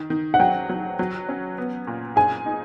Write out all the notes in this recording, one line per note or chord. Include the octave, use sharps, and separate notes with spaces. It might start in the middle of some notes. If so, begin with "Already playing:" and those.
Already playing: D#3
D#3
F#5
F#3 G5
F#3
F#3
C#4
B3
A#2
G#4 G#5
D#4